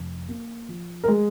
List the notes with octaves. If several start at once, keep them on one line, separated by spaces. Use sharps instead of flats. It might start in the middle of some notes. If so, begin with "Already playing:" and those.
Already playing: F1
A#3
F3
A#4
G#3 G#4